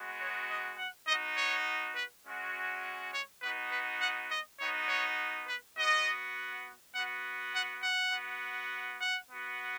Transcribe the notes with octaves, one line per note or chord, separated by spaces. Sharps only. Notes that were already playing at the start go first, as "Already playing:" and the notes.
Already playing: G#3 B3 F#4
C#5
D#5
F#5
B3 D#4 F#4 D#5
C#5
B4
G#3 C#4 F#4
C#5
B3 D#4 F#4 B4
B4
F#5
D#5
B3 D#4 F#4 C#5
C#5
B4
B3 F#4 D#5
B3 F#4 F#5
F#5
F#5
B3 F#4
F#5
B3 F#4